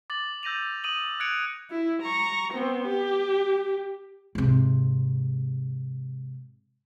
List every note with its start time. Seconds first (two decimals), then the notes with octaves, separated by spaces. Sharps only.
0.10 D6 A6 F#7
0.43 E6 G6 A#6 D#7 F7
0.84 D#6 D#7 F7 F#7
1.20 F#6 G#6 C#7 D7 F7
1.70 E4
2.03 A#5 C#6
2.53 B3 C4
2.88 G4
4.35 G#2 C3